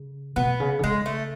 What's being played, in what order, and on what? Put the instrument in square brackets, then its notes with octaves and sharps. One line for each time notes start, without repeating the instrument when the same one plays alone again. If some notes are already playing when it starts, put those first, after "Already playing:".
Already playing: [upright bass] C#3
[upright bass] B2 [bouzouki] B3
[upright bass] C#3
D3
[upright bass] C#3 [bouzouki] G#3
[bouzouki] A3